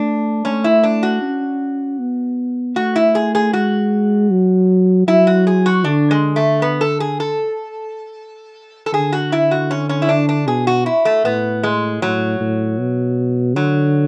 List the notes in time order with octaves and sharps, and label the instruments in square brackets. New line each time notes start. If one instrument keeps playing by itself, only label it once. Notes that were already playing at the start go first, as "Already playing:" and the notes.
Already playing: [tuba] A3 [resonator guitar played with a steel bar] D4
[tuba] A3 [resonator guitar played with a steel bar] C#4
[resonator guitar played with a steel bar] E4
D4
F#4
[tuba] C#4
B3
[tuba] A3 [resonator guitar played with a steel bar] F#4
[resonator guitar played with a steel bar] E4
G#4
G#4
[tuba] G#3 [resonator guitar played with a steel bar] F#4
[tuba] F#3
[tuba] F#3 [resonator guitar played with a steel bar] E4
[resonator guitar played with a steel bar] F#4
G#4
F#4
[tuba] D3 [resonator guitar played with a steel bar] D4
[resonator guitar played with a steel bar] G#3
A3
B3
A4
G#4
A4
A4
[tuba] D3 [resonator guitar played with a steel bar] G#4
[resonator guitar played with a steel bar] F#4
E4
F#4
C#4
C#4
E4
D4
D4
[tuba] B2 [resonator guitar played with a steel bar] G#4
[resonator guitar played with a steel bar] F#4
E4
A3
[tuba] A2 [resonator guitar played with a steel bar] B3
[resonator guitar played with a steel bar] G#3
[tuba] A2 [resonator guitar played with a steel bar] F#3
[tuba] A2
B2
[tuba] D3 [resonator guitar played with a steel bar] F#3